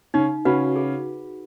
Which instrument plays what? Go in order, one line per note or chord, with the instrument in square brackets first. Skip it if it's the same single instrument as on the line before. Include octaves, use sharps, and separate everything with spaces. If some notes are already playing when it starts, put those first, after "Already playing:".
[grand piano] C#3 C#4 [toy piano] D#4
[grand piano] C#3 C#4 [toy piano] F#4 B4 F#5 B5
[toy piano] G#4